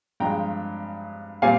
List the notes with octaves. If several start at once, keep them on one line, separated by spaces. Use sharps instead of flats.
G2 F3 G#3 G5 A#5
A#2 G3 C4 F5 G#5